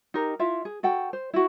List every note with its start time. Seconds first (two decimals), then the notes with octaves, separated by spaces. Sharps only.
0.14 D#4 G4 A#4
0.39 E4 F4 E5
0.65 G#4
0.83 F#4 A4 F#5 G5
1.13 C5
1.34 E4 F#4